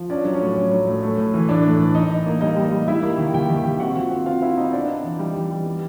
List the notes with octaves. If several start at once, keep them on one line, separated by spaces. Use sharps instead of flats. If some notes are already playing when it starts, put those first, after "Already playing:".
Already playing: F3
C#4 D4 D5
F#3
C#4 C#5
A2
C#4
F#3
A2
A3
A2
E3
A2 D4 D5
A3
E3
D#4 D#5
D#4
A#3
G3 D#4 D#5
G3
G3
G3 E4 E5
A#3
D#3
D#3 G4 G5
D#3
G4 G5
D#3
C4 F#4 F#5
F4
C4
C4 F4 F5
C4 E4 E5
C4 D#4 D#5
B3 D4 D5
D#4
E3
G3
E3
G3
B3